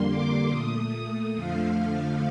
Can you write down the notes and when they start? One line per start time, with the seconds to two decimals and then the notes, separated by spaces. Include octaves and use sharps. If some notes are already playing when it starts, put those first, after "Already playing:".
Already playing: F2 D3 G3 A#3 C6
0.08 D6
0.50 A#2 A3 D#6
1.34 F2 D3 F3 A3 F5